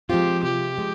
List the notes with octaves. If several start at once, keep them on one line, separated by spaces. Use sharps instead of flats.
F3 G#3 C4 F4 G4
C3 G4
F3 G#3